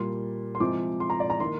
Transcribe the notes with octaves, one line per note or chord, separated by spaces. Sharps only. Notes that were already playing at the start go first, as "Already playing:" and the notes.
Already playing: A#2 G3 A#3 C6
C6
C3 F3 G#3 D6
C6
A#5
D5
A#5
D#3 A#3 C6